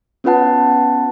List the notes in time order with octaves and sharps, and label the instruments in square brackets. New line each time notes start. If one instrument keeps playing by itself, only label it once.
[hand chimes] B3 C#4 F4 B4 F#5 A5